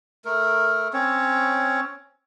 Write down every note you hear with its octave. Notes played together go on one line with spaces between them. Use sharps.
A3 A#4
C4 C#4 C#5